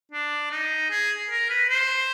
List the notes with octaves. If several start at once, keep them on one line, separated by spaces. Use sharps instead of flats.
D4
D#4
G#4
A#4
B4
C5